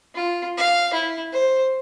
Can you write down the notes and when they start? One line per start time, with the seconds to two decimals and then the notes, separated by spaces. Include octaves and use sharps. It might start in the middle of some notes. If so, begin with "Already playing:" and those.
0.15 F4
0.58 F5
0.94 E4
1.33 C5